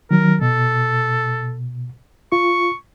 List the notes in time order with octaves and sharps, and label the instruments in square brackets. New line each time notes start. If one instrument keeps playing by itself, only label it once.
[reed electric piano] D#3 F#3 [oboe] A#4
[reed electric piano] B2 [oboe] A4
[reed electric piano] F4 [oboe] C#6